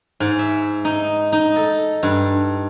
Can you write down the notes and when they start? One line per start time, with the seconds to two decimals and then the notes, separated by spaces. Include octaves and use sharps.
0.20 G#2
0.39 E5
0.85 D#4
1.32 D#4
1.56 A4
2.03 G2